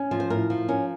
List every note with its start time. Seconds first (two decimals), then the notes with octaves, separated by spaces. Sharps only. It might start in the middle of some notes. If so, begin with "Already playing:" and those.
Already playing: C#4
0.11 F3
0.20 C5
0.30 A2 A#4
0.50 F3
0.68 C#4 A#4